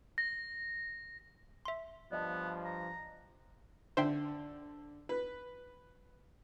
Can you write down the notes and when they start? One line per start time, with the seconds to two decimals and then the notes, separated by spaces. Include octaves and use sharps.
0.18 A#6
1.65 E5 C6
2.12 G2 F3 B3 D5 D#5 A5
2.65 A#5
3.97 D3 C5 E5 G5
5.09 B4